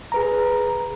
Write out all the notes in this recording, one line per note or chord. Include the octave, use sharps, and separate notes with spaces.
G#4 B4 A#5